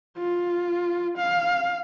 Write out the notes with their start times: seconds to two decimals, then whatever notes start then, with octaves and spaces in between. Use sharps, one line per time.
0.17 F4
1.17 F5